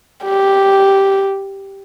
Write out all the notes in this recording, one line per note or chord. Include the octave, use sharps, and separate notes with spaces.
G4